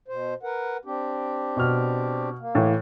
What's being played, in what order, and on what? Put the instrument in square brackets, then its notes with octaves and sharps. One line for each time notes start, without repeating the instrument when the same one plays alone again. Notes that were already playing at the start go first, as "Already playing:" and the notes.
[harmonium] B2 C5
A#4 B4 F#5
C4 D4 G4
[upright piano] B2 F6
[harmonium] A#3
[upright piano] A2 E3